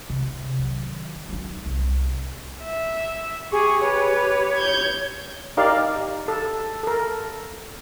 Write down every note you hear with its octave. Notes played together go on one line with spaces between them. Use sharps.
C3
D#3 F#3
F#3 D#4
C2
E5
G4 G#4 C#6
G4 B4 C#5
G6 G#6
D#4 G4 A#4 D5 F5
A4
A4 A#4